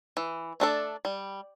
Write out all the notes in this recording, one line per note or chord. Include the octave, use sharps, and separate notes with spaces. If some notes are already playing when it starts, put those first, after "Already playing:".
E3
A3 D4 A4 D5
G3